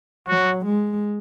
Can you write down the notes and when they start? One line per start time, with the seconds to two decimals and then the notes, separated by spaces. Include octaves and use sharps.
0.28 F#3 F#4
0.66 G#3